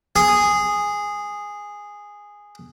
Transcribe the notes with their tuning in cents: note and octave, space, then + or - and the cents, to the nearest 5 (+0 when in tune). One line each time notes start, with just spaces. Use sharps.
G#4 -10